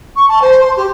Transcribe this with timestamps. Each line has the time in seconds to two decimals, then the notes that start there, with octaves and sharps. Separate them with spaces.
0.16 C#6
0.28 A5
0.42 C5
0.60 C6
0.77 G4